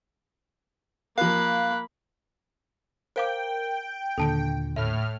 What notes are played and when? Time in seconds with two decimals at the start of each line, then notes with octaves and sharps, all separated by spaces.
1.18 F3 A#3 A#4 F5 B5 F#6
3.16 A#4 C5 F5 G5 D6
4.18 D#2 A#2 D3 A4 A5 D7
4.76 A2 E5 F6